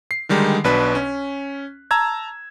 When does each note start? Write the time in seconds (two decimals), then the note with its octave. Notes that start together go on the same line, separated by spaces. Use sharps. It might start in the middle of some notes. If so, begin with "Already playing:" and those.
0.11 C7
0.29 D3 D#3 G3 G#3 D#4
0.64 B1 B2 D4 B4 F#6 B6
0.95 C#4
1.91 A5 A#5 E6 G#6